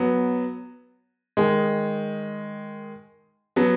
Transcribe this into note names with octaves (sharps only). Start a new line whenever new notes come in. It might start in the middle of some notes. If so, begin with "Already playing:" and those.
Already playing: F#3 B3
D#3 G#3
F#3 B3